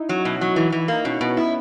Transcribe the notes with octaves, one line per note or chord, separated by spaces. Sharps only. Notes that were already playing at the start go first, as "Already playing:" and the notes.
Already playing: D#4 E4
F#3 C#4
D#4
B2 E4
F#3 D#4
E3
E3
E4
A#3 D#4
B2 C#4
B2 B3
B3 E4